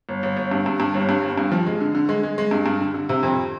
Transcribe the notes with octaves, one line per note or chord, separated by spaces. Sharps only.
G1
G1
G1
G2
G2
G2
G1
G2
G1
G2
F3
G#3
D3
D3
G#3
G#3
G#3
G2
G2
D3
D3
C3
F2